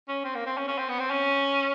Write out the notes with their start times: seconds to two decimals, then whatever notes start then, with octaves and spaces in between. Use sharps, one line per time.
0.09 C#4
0.24 C4
0.35 A#3
0.46 C4
0.57 C#4
0.68 C#4
0.78 C4
0.89 B3
1.00 C4
1.11 C#4